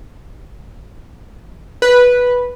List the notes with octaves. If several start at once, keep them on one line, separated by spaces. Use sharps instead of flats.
B4